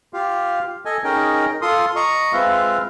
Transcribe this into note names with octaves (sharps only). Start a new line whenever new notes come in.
F4 G4 F5
A4 D#5 G#5
C#4 D#4 G#4 A#4 D#5 G5
F4 A4 C6 D#6
D#5 A#5 C#6 D#6
G#3 C4 F4 B4 E5 F5